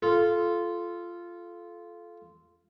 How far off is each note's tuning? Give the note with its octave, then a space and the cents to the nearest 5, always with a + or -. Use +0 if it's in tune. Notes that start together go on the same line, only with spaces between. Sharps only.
F4 -10 A4 -20